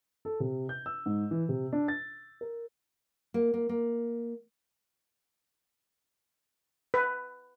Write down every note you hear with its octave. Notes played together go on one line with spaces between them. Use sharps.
A4
C3
G6
E6
G#2
E3
C3
D4
A6
A#4
A#3
A#3
A#3
B4